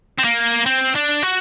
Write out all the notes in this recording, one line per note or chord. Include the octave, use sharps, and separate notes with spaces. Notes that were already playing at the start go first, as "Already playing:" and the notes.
C4
A#3
C4
D4
F#4